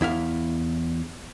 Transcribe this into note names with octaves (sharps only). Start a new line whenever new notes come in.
E2 E4 E5 F5